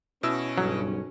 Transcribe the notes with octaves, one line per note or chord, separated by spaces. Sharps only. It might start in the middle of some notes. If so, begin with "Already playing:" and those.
B2 C#4 E4 E6
F#1 B1 G2 F#3